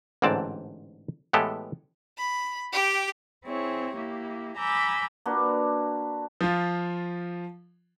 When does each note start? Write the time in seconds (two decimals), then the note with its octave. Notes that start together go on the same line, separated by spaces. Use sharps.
0.22 A1 G#2 D3 C4 D5 A5
1.33 A2 E3 G#3 B3 G4 A4
2.18 B5
2.73 G4 G5
3.44 C4 E4 G#4 C#5
3.93 A#3 E4 G4
4.56 G#5 A#5 B5 D6 E6 G6
5.26 A#3 D4 F#4 B4
6.41 F3 F4